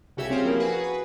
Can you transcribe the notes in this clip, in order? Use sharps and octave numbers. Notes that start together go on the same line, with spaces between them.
C2 C#3 F#4 G4 E5 G#6
C4 C#4 F4 G4 G#4 C5
F3 A#3 E4 A#4
F#4 G#4 B4
B4